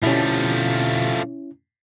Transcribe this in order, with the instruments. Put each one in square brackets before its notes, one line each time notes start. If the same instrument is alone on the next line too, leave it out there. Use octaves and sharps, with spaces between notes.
[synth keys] B2 D3 G4 [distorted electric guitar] F3 A3 [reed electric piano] C#4 E4